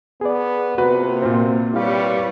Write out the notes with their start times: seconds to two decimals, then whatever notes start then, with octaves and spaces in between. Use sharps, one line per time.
0.21 B3 G#4 D5
0.78 C3 A#3 B3 F4 F#4 B4
1.22 A#2 C4
1.74 G3 E4 G4 B4 C#5 F5